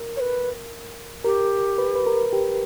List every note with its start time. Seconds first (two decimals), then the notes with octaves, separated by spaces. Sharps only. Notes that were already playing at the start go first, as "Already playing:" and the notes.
Already playing: A#4
0.16 C#5
0.20 B4
1.24 G4 A#4
1.78 B4
1.95 B4
2.07 A#4
2.33 G4